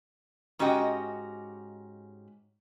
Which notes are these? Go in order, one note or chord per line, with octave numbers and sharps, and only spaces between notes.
G#2 C#4 F#4 G4 D#5 G5